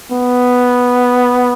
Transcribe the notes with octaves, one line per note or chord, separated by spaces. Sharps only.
B3